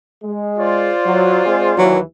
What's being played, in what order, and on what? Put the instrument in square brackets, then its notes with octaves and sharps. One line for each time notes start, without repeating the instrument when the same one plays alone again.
[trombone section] G#3
[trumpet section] F4 C5 D5
[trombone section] F#3
G#3 C4 G#4
[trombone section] D#2 E3 [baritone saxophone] F#3